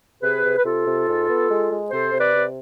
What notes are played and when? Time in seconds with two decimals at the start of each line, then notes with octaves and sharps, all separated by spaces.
0.22 C3 G#4 B4
0.43 C3
0.57 B4
0.64 C3 F4 A4
0.85 C3
1.07 G#2
1.28 B3
1.50 G#3
1.70 G#3
1.91 C3 A4 C5
2.12 C3
2.19 B4 D5
2.34 C3